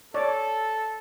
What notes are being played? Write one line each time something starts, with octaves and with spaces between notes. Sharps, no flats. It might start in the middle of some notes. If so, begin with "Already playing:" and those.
A4 C#5 D5